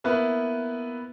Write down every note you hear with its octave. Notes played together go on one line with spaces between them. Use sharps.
A#3 B3 E4 B4